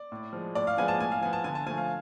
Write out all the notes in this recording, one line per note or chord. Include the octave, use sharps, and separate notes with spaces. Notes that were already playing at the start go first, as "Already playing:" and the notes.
Already playing: D5
A2
F3 G#3
A2 D5
F5
F3 G#3 B3 G#5
A5
A2 G#5
F5
F3 B3 G#5
A5
D3 G#5
A5
F3 A3 G#5
F5